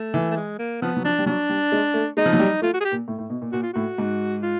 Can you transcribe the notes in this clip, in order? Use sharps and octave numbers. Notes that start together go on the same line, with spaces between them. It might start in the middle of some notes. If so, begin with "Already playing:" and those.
Already playing: A3
E3
A3
G#3
A#3
F3 B3
F#3
F3 D4
G3
F#3 D4
G3
G#3
A3
G#3 D#4
F3
F#3
G3
A3 F4
F#4
G#4
G4
A#2
A2
A2
B2
A#2
A#2 F#4
F4
A2 F#4
G#2
F4